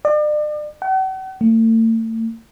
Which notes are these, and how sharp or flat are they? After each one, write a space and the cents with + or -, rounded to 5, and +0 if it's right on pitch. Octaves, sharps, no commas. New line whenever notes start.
D5 +40
F#5 +45
A3 +40